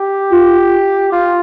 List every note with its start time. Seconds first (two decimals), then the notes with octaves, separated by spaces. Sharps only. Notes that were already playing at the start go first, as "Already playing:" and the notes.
Already playing: G4
0.32 F4
1.12 F4